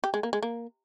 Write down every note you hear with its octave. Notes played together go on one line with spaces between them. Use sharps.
G4
G#3
A#3
G#3
A#3